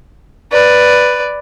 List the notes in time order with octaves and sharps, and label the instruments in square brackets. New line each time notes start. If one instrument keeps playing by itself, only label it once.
[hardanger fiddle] B4 D5